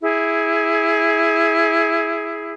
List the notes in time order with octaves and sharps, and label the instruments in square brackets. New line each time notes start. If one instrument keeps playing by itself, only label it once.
[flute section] E4 G#4